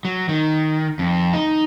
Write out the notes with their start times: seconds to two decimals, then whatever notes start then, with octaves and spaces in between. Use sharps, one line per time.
0.05 F#3
0.29 D#3
0.99 F2
1.33 D#4